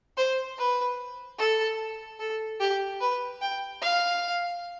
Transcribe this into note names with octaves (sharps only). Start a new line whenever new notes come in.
C5
B4
A4
A4
G4
B4
G5
F5